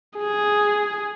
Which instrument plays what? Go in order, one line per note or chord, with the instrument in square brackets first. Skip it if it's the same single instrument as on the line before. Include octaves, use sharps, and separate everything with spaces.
[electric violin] G#4